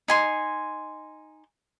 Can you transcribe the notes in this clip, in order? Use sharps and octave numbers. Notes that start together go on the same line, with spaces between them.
D#4 G#5 C6